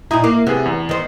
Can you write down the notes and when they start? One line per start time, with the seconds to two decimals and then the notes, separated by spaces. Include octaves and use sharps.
0.11 A#2 D#4 E4 A#5 D#6
0.24 A#3 D6
0.47 C3 B3 G#4
0.66 E2
0.89 D#3 C5